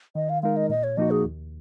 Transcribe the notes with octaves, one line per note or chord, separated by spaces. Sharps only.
D#3 D#5
F5
G#3 D#4 A#4 F5
D#5
A#2 D#5
C#5
F3 A#3 D#4 F#4 D#5
G#4
D#2